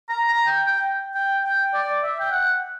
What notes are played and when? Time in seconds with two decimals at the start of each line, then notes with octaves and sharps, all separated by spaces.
0.09 A#5
0.28 A#5
0.46 G5
0.66 G5
1.14 G5
1.44 G5
1.73 D5
2.03 E5
2.20 G5
2.31 F#5